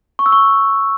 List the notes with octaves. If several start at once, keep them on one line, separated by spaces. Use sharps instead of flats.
C#6
E6
C#6